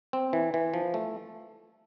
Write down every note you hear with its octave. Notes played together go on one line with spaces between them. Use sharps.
C4
E3
E3
F3
A3